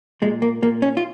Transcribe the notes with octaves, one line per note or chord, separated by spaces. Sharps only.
A#2 G#3
A#3
A#2 A#3
C#4
F4